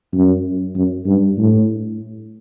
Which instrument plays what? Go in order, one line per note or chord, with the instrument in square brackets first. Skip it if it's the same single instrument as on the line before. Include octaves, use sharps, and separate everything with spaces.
[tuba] F#2
F#2
G2
A2